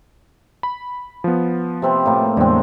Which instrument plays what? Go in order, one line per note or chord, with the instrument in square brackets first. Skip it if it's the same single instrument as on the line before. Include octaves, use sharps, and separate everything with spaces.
[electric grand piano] B5
F3 B3
[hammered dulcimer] C3 C4 B4
A2 A#3
[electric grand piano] E2 A2 G#3 [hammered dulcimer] D3 C4